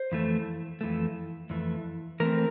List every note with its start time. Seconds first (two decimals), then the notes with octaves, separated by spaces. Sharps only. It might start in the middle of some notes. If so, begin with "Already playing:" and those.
Already playing: C5
0.12 F2 E3 A3
0.81 F2 E3 A3
1.50 F2 E3 A3
2.20 E3 A3 C4 A#4